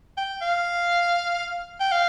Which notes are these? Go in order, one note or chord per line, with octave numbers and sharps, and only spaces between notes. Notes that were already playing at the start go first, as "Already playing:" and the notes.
G5
F5
G5
F5